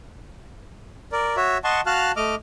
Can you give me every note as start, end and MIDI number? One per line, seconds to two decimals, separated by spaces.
1.12 1.36 70
1.12 1.36 74
1.36 1.58 66
1.36 1.58 73
1.36 1.58 76
1.64 1.81 75
1.64 1.81 78
1.64 1.81 81
1.64 1.81 84
1.64 1.81 85
1.86 2.12 66
1.86 2.12 77
1.86 2.12 81
1.86 2.12 89
1.86 2.12 90
2.16 2.35 57
2.16 2.35 75
2.16 2.35 86
2.16 2.35 89